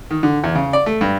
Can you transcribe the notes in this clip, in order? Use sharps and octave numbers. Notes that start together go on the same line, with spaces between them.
D#3
D3
E2
C#3
D5
A3
G2